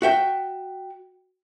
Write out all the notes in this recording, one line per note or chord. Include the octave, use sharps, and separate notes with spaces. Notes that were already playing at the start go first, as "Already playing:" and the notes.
F#4 E5 G5